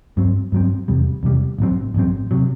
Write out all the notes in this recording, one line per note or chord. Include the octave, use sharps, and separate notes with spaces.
G2 F#3 C4
G2 F#3 C4
E2 C3 G3
E2 C3 G3
A1 A2 F#3 C4
A1 A2 F#3 C4
C3 F#3